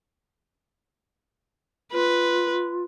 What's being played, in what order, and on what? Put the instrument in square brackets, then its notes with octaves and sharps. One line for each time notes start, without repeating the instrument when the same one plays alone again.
[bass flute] F4 [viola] B4